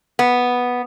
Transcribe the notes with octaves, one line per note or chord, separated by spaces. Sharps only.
B3